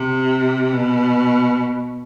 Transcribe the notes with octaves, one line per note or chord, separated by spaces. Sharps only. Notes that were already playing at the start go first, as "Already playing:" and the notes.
Already playing: C3
B2